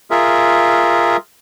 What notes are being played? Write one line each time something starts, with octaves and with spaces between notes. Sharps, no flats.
F4 G#4 A#4 E5